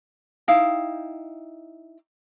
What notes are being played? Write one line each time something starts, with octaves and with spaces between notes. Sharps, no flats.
D#4 E4 F5 G5